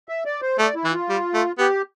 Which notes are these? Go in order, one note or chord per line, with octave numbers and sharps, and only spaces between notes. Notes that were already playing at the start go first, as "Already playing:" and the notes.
E5
D5
C5
A3 D5
E4
E3
F4
G3
A3
B3 G4